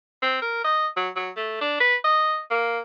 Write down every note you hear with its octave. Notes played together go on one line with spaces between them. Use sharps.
C4
A#4
D#5
F#3
F#3
A3
D4
B4
D#5
A#3